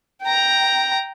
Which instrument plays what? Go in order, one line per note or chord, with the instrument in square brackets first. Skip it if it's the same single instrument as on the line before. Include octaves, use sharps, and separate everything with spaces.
[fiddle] G5 A#5